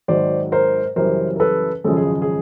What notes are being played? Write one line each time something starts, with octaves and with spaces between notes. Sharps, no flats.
G#1 G#2 D#3 F#3 C5 D5
A#4 C5
F#2 C#3 E3 G3 A#4 C5
A#4
A4 B4
G#1 F#2 C#3 F3 G#3 A4
G#4
G#4